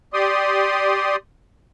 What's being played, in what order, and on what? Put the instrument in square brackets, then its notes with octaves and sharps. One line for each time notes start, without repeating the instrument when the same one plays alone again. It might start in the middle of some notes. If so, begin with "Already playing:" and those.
[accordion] G4 D5 C6 D#6